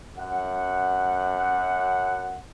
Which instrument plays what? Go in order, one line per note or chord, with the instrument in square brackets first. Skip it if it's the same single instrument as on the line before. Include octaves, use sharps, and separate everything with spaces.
[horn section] F#2 F#5